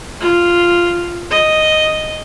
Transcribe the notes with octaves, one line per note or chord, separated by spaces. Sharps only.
F4
D#5